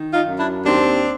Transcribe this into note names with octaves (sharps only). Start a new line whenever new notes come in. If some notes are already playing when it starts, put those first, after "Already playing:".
Already playing: D#3
D#4 F4
F#2
D4 E4
D#2 C4 D4